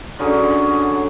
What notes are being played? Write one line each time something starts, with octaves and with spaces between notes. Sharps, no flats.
D3 F#3 C#4 G#4